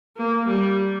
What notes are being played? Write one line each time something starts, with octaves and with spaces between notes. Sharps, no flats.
A#3
G3